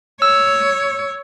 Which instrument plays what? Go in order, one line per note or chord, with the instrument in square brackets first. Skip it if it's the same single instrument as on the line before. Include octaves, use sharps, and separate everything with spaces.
[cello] C#5 [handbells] E6